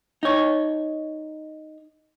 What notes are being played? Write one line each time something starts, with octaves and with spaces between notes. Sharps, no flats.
D#4 C#5